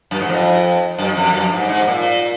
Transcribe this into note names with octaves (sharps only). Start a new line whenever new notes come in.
F#2
G#2
F2
F#2
F2
F#2
G#2
G#2
A#2